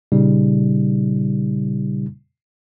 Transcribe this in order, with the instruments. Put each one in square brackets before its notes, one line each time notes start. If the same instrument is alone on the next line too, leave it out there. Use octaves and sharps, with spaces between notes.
[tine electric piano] A#2 C#3 G3 D#4